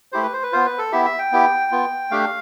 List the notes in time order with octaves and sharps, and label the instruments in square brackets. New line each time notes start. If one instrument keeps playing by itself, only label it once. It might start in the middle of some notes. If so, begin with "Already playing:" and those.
[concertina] A3 E4 G4 C5
B4
C5
B4
B3 F4 C5
B4
A4
B3 E4 G4 E5
E5
G5
B3 E4 G4
B3 F4
A3 D4 G4 F5